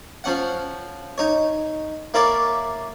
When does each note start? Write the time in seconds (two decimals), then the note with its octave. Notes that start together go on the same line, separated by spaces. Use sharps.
0.24 F3 C#4 F#5
1.18 D#4 C#5
2.14 A#3 E4 A#4 C#5 D5